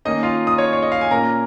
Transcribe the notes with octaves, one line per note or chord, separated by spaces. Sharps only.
D#3 A#3 C#4 D#4 D#5
F4 F5
D#6
C#5 C#6
C#5
D#5
F5
G#5
A#2 A#3 C#4 A#4 A#5